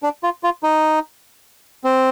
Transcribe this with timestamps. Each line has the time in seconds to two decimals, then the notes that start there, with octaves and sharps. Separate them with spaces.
0.03 D4
0.23 F4
0.44 F4
0.63 D#4
1.84 C4